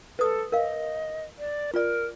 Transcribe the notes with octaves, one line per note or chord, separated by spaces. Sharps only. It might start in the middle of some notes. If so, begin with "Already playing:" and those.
A4 B4 D#6
A#4 D#5 F5
D5
F4 A#4 D5